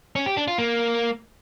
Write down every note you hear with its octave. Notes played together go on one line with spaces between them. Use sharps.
C#4
G4
D4
F4
A#3